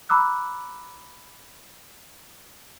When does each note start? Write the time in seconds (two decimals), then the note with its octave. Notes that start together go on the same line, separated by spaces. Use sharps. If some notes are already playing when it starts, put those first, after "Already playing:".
0.09 A#5 B5 D6 E6 F#6